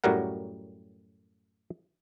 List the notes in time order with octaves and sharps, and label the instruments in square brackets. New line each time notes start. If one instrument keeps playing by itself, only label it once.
[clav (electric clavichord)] F#2 A2 F#3 G3 A#4 F#5